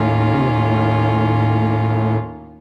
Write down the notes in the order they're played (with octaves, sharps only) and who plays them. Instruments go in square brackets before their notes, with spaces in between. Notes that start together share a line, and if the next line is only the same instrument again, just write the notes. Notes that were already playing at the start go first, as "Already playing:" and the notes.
Already playing: [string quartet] D#2 D#3 A#3 C#4 F4 [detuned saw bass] A2
[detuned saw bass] C#3
C3
A#2
A2